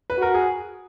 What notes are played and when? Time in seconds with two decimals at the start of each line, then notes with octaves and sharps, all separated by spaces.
0.10 B4
0.18 F#4 A#4
0.34 G#4